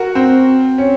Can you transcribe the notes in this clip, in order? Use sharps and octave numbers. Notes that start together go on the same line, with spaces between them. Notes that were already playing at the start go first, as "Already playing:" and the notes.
Already playing: F#4 A#4
C4
C#4